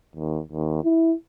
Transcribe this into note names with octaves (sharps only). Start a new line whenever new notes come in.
D#2
D#2
E4